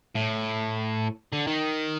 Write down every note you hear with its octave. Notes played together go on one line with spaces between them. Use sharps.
A2
D3
D#3